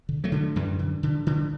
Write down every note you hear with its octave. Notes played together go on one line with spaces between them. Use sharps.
D3
F#3 A3
D3
F#2 E3 G3
D3
D3
D3